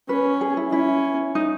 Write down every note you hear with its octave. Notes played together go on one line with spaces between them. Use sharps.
C#4 B4
G#4
E4
C#4 E4
D#4